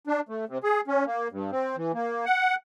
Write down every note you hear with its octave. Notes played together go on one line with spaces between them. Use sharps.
D4
A3
C3
G#4
C#4
A#3
G2
C4
E3
A#3
F#5